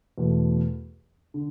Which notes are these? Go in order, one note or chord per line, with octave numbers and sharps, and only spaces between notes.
E2 B2 A3
D3